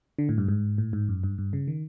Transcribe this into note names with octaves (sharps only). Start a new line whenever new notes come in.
D3
A2
G2
G#2
A2
G#2
F#2
G2
G2
C#3
D#3